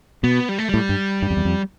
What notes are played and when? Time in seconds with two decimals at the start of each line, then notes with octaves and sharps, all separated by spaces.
0.24 B2 B3
0.49 G3
0.58 A3
0.69 A2 G3
0.89 G2
1.22 G2
1.30 F2
1.37 E2
1.45 F2